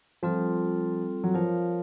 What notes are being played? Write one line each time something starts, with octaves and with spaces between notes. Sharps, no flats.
F3 G3 C4 F4 A4
F#3
F3 F4 A#4 C#5 F5